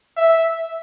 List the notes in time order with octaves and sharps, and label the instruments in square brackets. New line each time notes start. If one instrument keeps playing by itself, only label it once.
[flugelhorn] E5